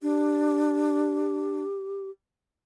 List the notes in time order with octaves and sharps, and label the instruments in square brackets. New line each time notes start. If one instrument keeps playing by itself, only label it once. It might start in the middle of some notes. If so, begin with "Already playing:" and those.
[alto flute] D4 [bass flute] G4